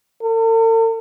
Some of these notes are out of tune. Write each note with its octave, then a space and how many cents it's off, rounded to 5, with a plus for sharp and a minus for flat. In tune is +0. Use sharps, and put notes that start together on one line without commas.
A4 +45